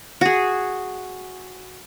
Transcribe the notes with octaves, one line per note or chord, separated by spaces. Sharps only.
F#4 G#4